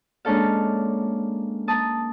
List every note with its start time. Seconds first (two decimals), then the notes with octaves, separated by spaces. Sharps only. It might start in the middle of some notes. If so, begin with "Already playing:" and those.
0.25 G#3 A#3 C#4 D4 A4 F5
1.68 A#3 A5 D#6